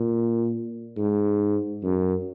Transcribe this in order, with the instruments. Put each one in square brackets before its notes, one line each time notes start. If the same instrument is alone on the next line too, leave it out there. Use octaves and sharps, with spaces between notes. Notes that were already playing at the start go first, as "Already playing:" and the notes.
Already playing: [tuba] A#2
G#2
F#2